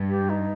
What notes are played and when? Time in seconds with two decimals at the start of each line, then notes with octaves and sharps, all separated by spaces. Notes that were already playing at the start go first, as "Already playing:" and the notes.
Already playing: G2
0.09 G4
0.29 D#4